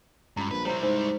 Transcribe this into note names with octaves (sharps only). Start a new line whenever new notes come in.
C#2 G2 A#5 B5
A#1 B4
G3 E4 C5 C#5 A#5
G#2 C5